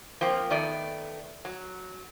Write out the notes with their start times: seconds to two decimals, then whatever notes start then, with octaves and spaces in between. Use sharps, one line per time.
0.21 F3 A#3 C4
0.50 D#3 A3 B3 D5
1.45 F#3